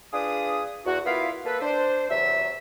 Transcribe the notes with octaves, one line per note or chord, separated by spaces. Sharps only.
D4 F4 G#4 B4 D#6
E2 F#4
B3 E4 F4 A#4 B4 F5
A#3 A4 B4
D4 C5
E2 C3 F#3 E5